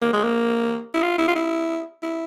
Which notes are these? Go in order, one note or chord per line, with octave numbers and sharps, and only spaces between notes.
A#3
G#3
A#3
E4
F4
E4
F4
E4
E4